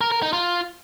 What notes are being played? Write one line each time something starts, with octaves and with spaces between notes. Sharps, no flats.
A#4
A#4
D#4
F4